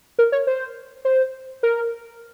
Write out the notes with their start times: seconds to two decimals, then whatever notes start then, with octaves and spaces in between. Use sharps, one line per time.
0.19 A#4
0.32 C#5
0.47 C5
1.05 C5
1.63 A#4